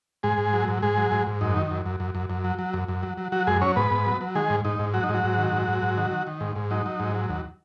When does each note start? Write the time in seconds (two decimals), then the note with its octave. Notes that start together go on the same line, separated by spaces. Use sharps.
0.23 G#2 G#3 G#4
0.38 G#2
0.53 F#3
0.68 G#2
0.82 G#2 G#3 G#4
0.97 F#3
1.12 G#2
1.27 G#2
1.41 F#2 D#4
1.56 D#3
1.71 F#2
1.86 F#2
2.00 F#2
2.15 F#2
2.30 F#2
2.44 F#3
2.59 F#3
2.74 F#2
2.88 F#2
3.03 F#3
3.18 F#3
3.32 F#3 F#4
3.47 F#2 G#3 G#4
3.61 F#3 C#4 C#5
3.76 G#2 B3 B4
3.91 G#2
4.06 F#3
4.21 F#3
4.35 D#3 G#3 G#4
4.50 G#2
4.65 G#2 D#4
4.79 G#2
4.94 F#3 F#4
5.04 D#4
5.09 G#2
5.14 F#3 F#4
5.24 G#2
5.38 D#3
5.53 G#2
5.68 G#2
5.82 G#2
5.97 D#3
6.11 D#3
6.27 D#3
6.41 G#2
6.56 G#2
6.71 F#3 D#4
6.86 F#3
7.00 G#2
7.15 F#3
7.29 D#2